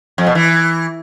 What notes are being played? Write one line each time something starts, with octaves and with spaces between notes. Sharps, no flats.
F2
B2
E3